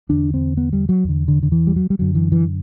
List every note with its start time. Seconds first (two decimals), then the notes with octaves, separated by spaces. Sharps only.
0.09 E2 D3 D4
0.34 C4
0.57 B3
0.73 G3
0.89 F#3
1.04 E2 D3
1.28 D3
1.43 D3
1.52 E3
1.67 G3
1.76 F#3
1.90 G3
1.99 F#2 D3 F#3
2.15 E3
2.32 E3